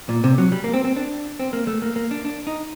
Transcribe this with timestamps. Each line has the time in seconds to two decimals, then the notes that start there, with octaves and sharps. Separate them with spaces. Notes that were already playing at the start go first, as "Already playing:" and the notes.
0.09 A#2
0.24 C3
0.38 F#3
0.52 G3
0.64 A#3
0.74 C4
0.84 C4
0.96 D4
1.40 C4
1.53 A#3
1.67 A3
1.82 A#3
1.96 A#3
2.11 D4
2.25 D4
2.47 D#4